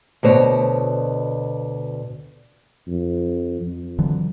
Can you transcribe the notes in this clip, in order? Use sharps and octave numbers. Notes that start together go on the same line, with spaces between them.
D2 B2 C5 C#5
F2
F2
D3 E3 F#3